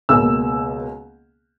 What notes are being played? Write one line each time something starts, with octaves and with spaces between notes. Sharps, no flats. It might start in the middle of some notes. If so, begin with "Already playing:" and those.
C#2 B2 A#3 E6